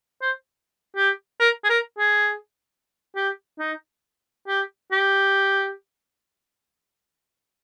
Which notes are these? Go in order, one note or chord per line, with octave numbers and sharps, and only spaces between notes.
C5
G4
A#4
G#4
A#4
G#4
G4
D#4
G4
G4